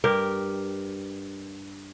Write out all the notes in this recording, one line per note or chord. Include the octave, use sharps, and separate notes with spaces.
G2 G4 A#4